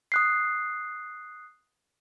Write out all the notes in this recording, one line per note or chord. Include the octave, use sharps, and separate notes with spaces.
D#6 F#6 C7